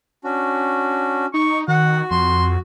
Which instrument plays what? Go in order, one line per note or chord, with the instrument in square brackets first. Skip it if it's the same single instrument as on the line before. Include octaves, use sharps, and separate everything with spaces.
[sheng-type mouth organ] C#4 D4 F#4
[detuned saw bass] D#4 [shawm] C#6
[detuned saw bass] D#3 [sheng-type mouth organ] F#4 [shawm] F#5
[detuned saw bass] F2 [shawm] C6